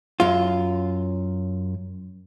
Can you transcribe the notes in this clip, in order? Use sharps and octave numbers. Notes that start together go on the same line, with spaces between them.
F#2 F4